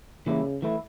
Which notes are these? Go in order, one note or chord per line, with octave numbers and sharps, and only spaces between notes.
C#3 E3 G3 A#3 E4
E3 A3 E4